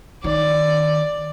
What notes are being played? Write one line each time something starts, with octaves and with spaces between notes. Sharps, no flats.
D#3 D5